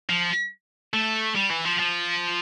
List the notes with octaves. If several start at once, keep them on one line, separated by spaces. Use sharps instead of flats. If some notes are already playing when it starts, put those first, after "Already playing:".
F3
A3
G3
E3
F3
F3